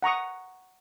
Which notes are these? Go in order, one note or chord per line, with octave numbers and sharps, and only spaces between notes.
F#5 A#5 C#6 D#6